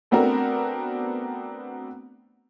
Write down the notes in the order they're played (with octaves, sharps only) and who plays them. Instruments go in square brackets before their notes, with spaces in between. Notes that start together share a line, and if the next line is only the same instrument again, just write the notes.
[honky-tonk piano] A3 B3 C4 D4 F#4 A#4